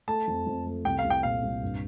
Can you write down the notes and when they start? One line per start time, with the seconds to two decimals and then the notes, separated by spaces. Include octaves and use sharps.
0.08 A3 A5
0.27 F2
0.46 F2
0.66 A3
0.85 C2 G5
0.99 F5
1.05 C2
1.10 G5
1.23 A#2 F5
1.43 C2
1.62 G2